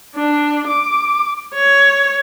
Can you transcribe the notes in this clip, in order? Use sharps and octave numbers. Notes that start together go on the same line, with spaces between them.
D4
D6
C#5